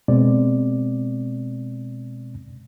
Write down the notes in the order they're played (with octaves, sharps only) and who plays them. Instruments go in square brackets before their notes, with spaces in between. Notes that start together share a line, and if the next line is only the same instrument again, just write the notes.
[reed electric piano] B2 G#3 C4 D5